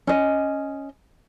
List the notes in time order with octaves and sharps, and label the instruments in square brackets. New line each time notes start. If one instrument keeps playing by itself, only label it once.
[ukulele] C#4 D#5